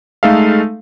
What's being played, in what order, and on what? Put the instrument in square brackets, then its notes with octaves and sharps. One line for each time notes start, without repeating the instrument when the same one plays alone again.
[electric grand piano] G#3 A3 D#4 A4 E5 F5